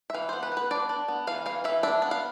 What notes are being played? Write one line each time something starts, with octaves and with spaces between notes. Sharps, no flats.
E5
E3 F5
B3 C5
B4
B3
B4
D4 D5
D4
B3
E3 F5
E3 F5
E3 E5
D4 E5
B3
F5